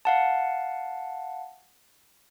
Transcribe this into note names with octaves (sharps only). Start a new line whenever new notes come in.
F5 F#5 A5